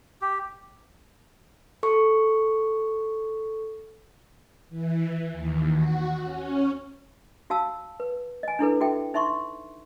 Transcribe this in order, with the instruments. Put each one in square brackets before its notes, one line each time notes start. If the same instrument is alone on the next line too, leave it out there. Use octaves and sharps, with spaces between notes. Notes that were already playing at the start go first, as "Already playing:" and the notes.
[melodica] G4
[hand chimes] A4 C#6
[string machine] E3
D#2
F#4
C#4
[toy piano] F#4 F5 A5 E6
B4
D#5 G#5
D4 E4 A4 B4
F#4 A4 E5 G5
D#4 E5 C6 C#6